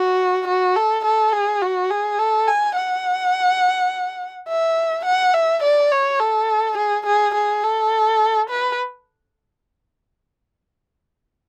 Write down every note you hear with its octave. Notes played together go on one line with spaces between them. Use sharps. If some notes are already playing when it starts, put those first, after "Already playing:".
Already playing: F#4
F#4
A4
A4
G#4
F#4
G#4
A4
G#5
F#5
E5
F#5
E5
D5
C#5
A4
G#4
G#4
G#4
A4
B4